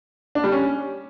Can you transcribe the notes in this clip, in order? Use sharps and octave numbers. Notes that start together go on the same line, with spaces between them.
D4
G3
C#4